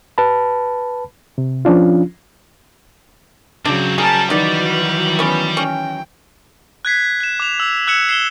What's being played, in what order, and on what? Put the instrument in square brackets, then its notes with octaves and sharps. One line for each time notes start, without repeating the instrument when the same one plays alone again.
[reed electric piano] B4 A5 B5
C3
F3 C#4 D4 F4
[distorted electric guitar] C#2 C4 [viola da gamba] C#3 F#3 [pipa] D4
[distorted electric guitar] G3 [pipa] G#4 [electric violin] A#4 A5
[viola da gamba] D#3 E3 F#3 [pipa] D#4 D5 [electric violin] F#4 B4
[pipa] B3 C#4
[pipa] C#4 [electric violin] G5
[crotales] F#6 G#6 B6 C7
F#6 E7
D6 E7 F7
E6
E6 F#6 G#6 C#7 E7
C7 E7 G7